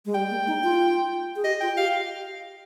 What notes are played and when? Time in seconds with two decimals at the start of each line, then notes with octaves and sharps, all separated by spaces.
0.05 G#3
0.14 G3 G5
0.30 A#3
0.47 D#4
0.63 F4
1.36 G#4
1.44 G4 D#5
1.61 F4 G5
1.77 G4 F5